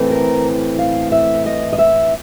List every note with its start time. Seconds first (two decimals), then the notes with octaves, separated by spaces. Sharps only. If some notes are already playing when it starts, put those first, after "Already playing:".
Already playing: A2 E3 A3 C4
0.11 A#4
0.79 F5
1.12 E5
1.46 D#5
1.73 D#5
1.79 E5